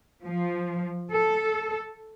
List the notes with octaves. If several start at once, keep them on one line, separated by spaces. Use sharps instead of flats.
F3
A4